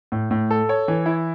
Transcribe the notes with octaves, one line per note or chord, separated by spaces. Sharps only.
A2
A2
A4
C#5
E3
E4